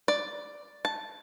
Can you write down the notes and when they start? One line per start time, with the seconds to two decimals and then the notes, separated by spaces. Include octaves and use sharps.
0.08 D5
0.85 A5